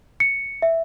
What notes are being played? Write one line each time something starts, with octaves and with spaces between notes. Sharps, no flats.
C#7
E5